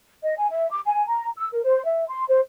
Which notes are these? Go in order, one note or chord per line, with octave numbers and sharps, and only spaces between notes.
D#5
G#5
E5
D6
G#5
A#5
E6
A#4
C5
E5
C6
C5